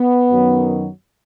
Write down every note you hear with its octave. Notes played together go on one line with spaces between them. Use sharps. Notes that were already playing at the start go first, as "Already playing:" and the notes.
Already playing: B3
F#2 D#3 F#3